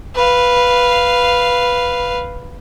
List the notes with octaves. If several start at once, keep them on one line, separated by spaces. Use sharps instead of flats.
B4 F5